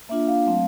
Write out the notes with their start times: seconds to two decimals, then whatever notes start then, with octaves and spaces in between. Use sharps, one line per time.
0.09 A#3 D4 F4 E5
0.28 F5
0.46 F#3 A3 C4